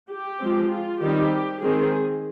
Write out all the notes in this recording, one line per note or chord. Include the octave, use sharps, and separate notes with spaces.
G4
F3 G#3 C4
F4
D#3 G3 C4 D#4 G4
D#3 G#3 C4 G#4